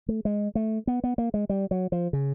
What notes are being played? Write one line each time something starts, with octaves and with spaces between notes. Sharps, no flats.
A3
G#3
A3
B3
B3
A#3
G#3
G3
F#3
F3
C#3